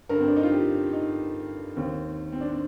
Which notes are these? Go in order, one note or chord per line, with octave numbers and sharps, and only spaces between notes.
G2 D3 A#4
C4
D4
D#4
F4
G4
D#4
D#2 D#3 C4
C4
D4
C4